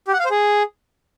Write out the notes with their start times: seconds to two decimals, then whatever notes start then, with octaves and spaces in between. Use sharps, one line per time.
0.08 G4
0.13 F#5
0.19 F5
0.25 C5
0.31 G#4